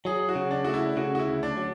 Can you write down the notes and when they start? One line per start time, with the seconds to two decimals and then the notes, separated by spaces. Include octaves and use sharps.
0.05 F#3 G#4
0.29 F#4
0.36 C#3
0.51 D4
0.64 A3 F#4
0.74 E4
0.97 C#3 F#4
1.15 F#4
1.20 E4
1.27 D2
1.43 D4
1.57 F#3